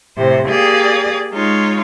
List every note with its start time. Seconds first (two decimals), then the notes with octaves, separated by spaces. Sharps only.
0.17 A2 C3 C5
0.49 A#3 G4 G#4 D5 D#6
1.32 G#3 D#4 F4 C#5